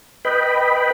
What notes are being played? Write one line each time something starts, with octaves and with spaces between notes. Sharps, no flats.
B4 D#5 G5 B5